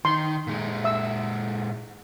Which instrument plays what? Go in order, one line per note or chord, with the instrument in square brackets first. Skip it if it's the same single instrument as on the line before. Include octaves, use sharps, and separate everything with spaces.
[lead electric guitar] D#3 [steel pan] C6
[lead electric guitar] A#2 G#3
[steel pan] E5 E6